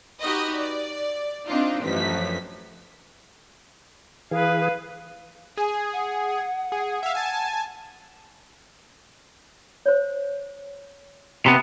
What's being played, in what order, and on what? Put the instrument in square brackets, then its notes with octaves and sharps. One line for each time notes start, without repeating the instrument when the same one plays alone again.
[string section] D#4 F#4 G4 B4 D#5
D5
C4 D4 D#4 F4
A1 F#2 F3 B6
[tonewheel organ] E3 G#4 [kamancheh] B4 F5
[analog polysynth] G#4 [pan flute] G#5
[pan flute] F#5
[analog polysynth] G#4
E5 F5
G#5 A5
[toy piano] C5 C#5
[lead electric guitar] C3 B3 [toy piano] B5